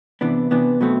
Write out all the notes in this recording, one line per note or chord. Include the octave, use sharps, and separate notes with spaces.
C3 E3 B3 D4
C3 E3 B3 D4
B2 F#3 A3 C4